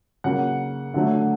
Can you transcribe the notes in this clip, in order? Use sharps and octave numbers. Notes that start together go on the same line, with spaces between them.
C#3 F#3 A#3 F#5
D3 F#3 A3